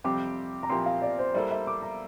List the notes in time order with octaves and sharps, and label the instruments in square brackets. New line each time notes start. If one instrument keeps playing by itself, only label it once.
[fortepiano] F2 C3 G3 C4 G4 [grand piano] D6
[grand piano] A#5
[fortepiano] A#2 F3 C4 E4 G4 [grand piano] C6
[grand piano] F5
D5
C5
[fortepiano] G3 A#3 E4 A4 C5 [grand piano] D5
[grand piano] E5
D6
A#5